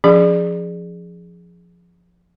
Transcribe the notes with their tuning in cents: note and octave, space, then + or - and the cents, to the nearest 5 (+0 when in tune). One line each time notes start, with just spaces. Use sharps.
F3 +5 C#4 +35 G#4 +0